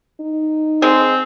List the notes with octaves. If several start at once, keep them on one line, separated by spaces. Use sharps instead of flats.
D#4
G#3 C4